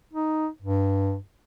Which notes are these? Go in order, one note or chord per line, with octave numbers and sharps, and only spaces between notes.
D#4
G2